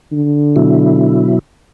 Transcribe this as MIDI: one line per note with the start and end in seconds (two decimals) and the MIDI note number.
0.12 1.32 50
0.56 1.39 47
0.56 1.39 54
0.56 1.39 64